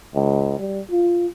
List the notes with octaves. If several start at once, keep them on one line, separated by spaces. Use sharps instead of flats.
C#2
G3
F4